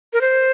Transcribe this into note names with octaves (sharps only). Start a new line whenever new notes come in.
A#4
C5